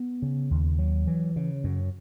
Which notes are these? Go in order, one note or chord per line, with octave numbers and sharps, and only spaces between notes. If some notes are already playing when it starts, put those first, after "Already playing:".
Already playing: B3
C#3
D#2
F#3
E3
C#3
F#2